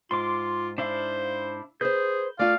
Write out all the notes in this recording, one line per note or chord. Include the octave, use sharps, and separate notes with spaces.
G#2 F4 C6 D6
D4 E4 C5 F5
G#4 B4 C5 G6
A3 F4 D5 F5